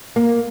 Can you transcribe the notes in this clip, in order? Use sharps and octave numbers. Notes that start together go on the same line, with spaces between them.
A#3